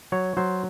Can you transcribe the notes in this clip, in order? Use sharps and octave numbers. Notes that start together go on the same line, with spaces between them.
F#3 C#5
F#3 C5